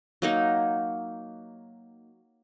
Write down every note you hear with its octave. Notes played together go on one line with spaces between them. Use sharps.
F#3 A#3 D#4